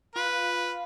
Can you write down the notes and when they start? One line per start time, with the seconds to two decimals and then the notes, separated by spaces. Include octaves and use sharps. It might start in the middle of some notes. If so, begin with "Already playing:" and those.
0.15 F4 B4 F5